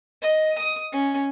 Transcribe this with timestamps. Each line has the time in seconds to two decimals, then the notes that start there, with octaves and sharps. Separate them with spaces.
0.22 D#5
0.58 D#6
0.93 C#4